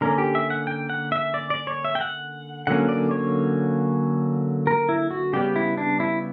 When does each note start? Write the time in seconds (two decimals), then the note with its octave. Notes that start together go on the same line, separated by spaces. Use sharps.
0.01 D3 A#3 C#4 A#4
0.18 G4
0.35 E5
0.50 F#5
0.67 G5
0.90 F#5
1.12 E5
1.34 D5
1.50 D5
1.67 C#5
1.85 E5
1.95 G5
2.01 F#5
2.67 D3 F#3 A#3 C#4 F#5
2.89 D5
3.11 C#5
4.67 A#4
4.89 E4
5.11 F#4
5.33 C#3 G3 B3 G4
5.56 E4
5.77 D4
6.00 E4